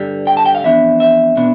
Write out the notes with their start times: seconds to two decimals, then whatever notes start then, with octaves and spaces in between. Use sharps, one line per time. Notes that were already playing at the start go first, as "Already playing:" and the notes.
Already playing: G2 D3 G3
0.27 G5
0.37 A5
0.46 G5
0.55 F5
0.64 F2 E3 B3 D4 E5
1.00 E5
1.37 B2 B3 D4